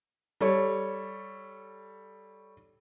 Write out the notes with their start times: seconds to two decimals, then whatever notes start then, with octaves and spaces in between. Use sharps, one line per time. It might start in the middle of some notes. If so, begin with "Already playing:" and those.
0.41 G3 A4 C#5